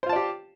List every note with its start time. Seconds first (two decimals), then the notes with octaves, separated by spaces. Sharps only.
0.03 C5
0.06 F4
0.09 A5
0.13 D5
0.16 G4